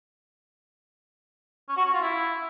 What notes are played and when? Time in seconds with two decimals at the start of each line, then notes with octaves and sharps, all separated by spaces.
1.69 C#4
1.77 F#4
1.85 C#4
1.93 F4
2.01 E4